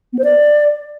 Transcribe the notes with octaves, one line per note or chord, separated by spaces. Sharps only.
B3
C5
D5